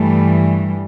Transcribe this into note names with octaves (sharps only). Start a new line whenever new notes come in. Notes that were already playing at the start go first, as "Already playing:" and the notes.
Already playing: G2 E3 G3 A3